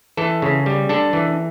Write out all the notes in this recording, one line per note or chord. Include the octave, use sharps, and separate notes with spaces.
E3 A4
C#3
G3
D4 A4
E3